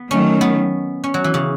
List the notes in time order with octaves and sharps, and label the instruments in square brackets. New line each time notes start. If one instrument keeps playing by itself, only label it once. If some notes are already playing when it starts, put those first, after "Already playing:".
Already playing: [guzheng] B3
[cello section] D#3 F#3 A3 [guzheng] C#4
[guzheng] B3
C#4
F#3
E3
C#3